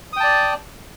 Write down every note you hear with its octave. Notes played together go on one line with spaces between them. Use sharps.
D5 G5 A5 D#6